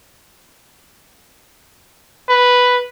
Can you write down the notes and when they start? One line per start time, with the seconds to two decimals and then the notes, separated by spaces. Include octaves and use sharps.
2.29 B4